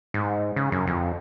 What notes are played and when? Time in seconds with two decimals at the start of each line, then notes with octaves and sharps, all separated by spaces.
0.14 G#2
0.56 C#3
0.72 F#2
0.87 F2